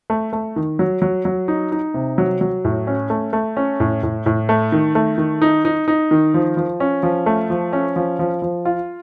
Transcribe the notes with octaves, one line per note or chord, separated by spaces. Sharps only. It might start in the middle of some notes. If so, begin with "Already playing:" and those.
A3
A3
D#3
F#3
F#3
F#3
D#4
D#4
C3
F#3
F#3
A2
C#4
A3
A3
C#4
A2
A2
A2
A3
D#3
A3
D#3
D#4
D#4
D#4
D#3
F3
F3
C#4
F3
A3
F3
C#4
F3
F3
F3
F4